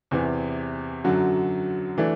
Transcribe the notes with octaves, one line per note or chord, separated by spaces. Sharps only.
E2 C3 E3
F#2 D3 F#3
E3 A3 D4